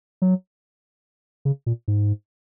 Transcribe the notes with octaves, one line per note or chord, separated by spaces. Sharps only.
F#3
C#3
A#2
G#2